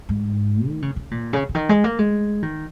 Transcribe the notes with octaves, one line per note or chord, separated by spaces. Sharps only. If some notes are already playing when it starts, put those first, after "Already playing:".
G#2
D#3
C#3
C#3
A#2
C#3
C#3
D#3
G#3
A#3
G#3
D#3